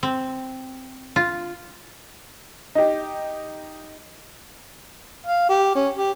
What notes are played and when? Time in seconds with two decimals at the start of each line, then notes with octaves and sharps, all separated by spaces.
0.03 C4
1.16 F4
2.75 D#4 G4
5.26 F5
5.49 G4
5.75 C#4
5.97 G4